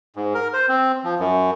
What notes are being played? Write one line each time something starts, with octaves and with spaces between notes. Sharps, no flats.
G#2
A#4
C5
C4
F3
F#2